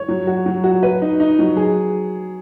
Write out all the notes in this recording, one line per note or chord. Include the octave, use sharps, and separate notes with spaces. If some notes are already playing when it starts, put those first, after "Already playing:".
Already playing: C#5
F#3
F#4
F#3
F#4
B4
D#4
D#4
F#3
G#4